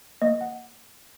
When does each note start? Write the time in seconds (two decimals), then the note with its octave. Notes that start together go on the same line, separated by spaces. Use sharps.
0.22 A#3 D#5
0.41 F#5